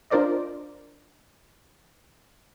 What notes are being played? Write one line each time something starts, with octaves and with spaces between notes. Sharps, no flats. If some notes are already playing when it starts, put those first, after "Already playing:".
D4 F4 A#4 C5 D5 D#5